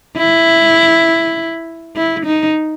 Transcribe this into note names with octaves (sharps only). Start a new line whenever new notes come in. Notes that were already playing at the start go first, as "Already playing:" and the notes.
E4
E4
D#4